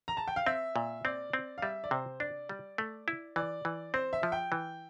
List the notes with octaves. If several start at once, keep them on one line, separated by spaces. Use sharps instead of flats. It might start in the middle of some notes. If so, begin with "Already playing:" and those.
A#5
A5
G5
F5
C4 E5
A#2
C4 D5
C4
F5
G3 E5
D5
C3 C5
D4 D5
G3
A3
E4
E3 D5
E3
C4 C5
E5
F3
G5
E3